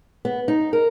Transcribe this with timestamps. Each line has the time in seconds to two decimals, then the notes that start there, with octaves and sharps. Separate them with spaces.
0.25 B3
0.48 D#4
0.73 A#4